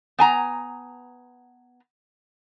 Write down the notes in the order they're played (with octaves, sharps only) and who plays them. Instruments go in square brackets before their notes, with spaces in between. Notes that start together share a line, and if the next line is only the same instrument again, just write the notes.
[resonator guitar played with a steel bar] B3 G#5 A#5